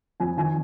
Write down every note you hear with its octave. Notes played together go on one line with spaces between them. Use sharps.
F2 G#5
D#3 G#5